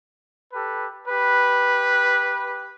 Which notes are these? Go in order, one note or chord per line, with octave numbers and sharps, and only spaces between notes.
G4 A4 B4
G4 B4